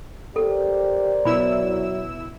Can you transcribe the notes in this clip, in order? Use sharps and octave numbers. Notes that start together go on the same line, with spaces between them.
G4 A4 A#4 C5 D5
B2 F#3 E4 B5 E6